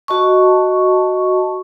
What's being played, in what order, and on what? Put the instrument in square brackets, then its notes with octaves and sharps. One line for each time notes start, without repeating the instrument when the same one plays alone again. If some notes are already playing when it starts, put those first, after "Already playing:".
[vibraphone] F#4 D#5 A5 C#6